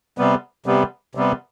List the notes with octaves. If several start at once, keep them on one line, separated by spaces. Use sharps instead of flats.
C3 G3 B3
C3 G3 B3
C3 G3 B3